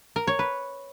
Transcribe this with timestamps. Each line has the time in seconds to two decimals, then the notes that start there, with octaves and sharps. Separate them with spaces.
0.16 A#4
0.27 C#5
0.39 B4